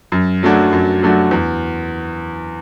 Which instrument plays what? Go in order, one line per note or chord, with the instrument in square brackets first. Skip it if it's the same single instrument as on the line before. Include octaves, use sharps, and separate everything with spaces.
[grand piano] F#2
F#3 A3 D4 F#4
F#2
F#3 A3 D4 F#4
E2